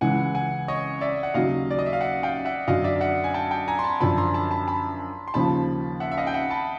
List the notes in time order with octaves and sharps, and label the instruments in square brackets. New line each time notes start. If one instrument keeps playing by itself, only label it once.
[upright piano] C#2 C#3 E3 G#3 [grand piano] F#5 G#5
[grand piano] F#5 G#5
C#5 D#5
D5 E5
F#5
[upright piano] D#2 C#3 F#3 [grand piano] D#5 F5
[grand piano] D5
D#5
E5
F5
E5 F#5
F5 G5
E5 F#5
[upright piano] F#2 D3 F#3 [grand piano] D#5 F5
[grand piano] D5 E5
E5 F#5
G#5
G5 A5
G5 A5
G#5 A#5
C6
A5 B5
[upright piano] F#2 D3 F3 [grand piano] A5 B5
[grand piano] A#5 C6
A5 B5
A5 B5
A5 B5
C6
[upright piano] D#2 C#3 F3 [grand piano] A5 B5
[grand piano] E5 F#5
E5
D#5 F5
G5
E5 F#5
A5 B5